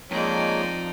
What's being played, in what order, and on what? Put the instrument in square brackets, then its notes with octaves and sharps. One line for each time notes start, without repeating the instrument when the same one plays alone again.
[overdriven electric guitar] F2 [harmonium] G#3 A#3 C#5 [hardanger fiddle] D#4 D5